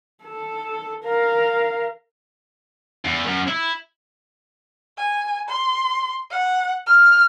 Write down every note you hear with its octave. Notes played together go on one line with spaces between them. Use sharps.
A4
A#4 F5
E2
F#2
E4
G#5
C6
F#5
F6